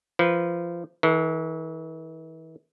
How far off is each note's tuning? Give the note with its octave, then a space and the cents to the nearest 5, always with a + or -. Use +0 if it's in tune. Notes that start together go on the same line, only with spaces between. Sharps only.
F3 -25 B4 -20
E3 -40 A4 +0